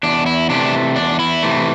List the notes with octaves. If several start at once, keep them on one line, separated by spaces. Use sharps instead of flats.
E2 D4
E4
C3 E3 A3 D4
E2 D4
E4
C3 E3 A3